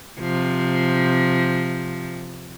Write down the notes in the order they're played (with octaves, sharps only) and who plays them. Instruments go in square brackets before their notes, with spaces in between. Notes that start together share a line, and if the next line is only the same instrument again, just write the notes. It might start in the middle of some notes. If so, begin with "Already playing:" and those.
[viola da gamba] C3 F3